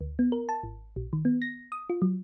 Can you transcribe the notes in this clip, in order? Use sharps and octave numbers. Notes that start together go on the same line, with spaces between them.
D2
B3
A#4
A5
G#1
A#1
D#3
B3
A#6
D#6
F4
F#3